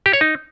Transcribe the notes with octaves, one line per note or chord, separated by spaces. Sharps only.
G4
C#5
D#4